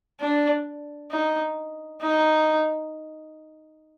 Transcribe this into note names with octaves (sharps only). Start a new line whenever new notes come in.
D4
D#4
D#4